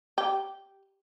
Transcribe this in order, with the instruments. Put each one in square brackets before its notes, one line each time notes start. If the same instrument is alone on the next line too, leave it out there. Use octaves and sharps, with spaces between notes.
[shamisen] G4